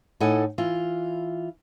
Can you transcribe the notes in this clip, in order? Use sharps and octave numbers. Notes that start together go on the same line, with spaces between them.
A2 D#4 E4 A4 F#5 G#5
E3 F4